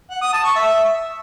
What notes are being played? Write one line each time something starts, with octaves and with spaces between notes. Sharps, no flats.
F#5
D#6
A5
C#6
E5